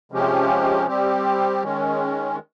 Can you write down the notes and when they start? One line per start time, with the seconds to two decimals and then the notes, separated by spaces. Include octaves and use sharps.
0.12 C3 F3 G#3 C#4 G4
0.88 G3 C4 G4
1.63 D#3 G#3 C#4